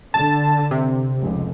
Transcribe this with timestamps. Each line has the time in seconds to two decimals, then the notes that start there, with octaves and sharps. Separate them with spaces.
0.14 D3 A5
0.71 C3
1.21 F1 C#2